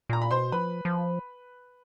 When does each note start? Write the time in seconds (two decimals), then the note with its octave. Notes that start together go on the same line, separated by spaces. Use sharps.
0.09 A#2 A#5
0.22 B5
0.31 B2 C5 C6
0.52 F3 B4 B5
0.85 F3